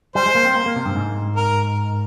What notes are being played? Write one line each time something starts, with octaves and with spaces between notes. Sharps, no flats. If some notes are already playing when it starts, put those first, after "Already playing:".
G3 C5
G#3
A#3
C4
A#3
A#3
C3
G2
G#2
A#4